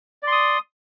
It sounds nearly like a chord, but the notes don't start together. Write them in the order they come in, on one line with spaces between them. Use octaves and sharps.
D5 C6 D#6